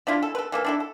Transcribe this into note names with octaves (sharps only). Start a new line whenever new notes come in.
F3 D4 E4 F4
A4
A4 B4
E3 A#3 A4
D4 E4 A4
A4